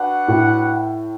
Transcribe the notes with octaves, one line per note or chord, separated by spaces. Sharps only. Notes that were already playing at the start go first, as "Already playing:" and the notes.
Already playing: D4 F#4 B4 F#5
A2